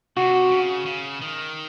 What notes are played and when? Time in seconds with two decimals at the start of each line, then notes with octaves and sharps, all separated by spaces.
0.17 C3 F#4
0.51 C#3
0.86 C#3
1.22 D#3